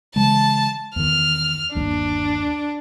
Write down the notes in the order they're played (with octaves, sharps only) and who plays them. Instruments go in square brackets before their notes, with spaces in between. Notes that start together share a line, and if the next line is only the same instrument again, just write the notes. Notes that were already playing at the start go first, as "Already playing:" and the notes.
[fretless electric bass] C#3 E3 G#3 [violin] A5
[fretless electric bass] E2 D#3 [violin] F6
[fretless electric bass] G1 D#2 [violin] D4